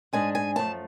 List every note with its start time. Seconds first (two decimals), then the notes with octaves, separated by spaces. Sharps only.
0.13 G#2 G#3 D4 G#5
0.35 G#5
0.56 F#2 F3 A3 A5